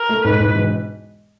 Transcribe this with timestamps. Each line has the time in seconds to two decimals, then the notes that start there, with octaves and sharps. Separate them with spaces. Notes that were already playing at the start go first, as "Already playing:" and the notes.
Already playing: A#4
0.09 A3
0.24 G#2 B4
0.40 G#2
0.55 E1